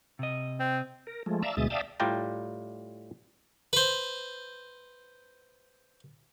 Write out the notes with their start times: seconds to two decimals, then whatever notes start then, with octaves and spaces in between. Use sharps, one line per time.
0.19 C3 D#5
0.60 C4
1.07 A#4
1.26 F3 G#3 A3
1.43 D5 E5 F5 A5 A#5 E6
1.57 D2 B2 G#3 E5 D#6 A6
1.70 D5 E5 F5 G5 A5 D#6
2.00 A2 G3 F4 D5 G5 A#5
3.73 B4 C5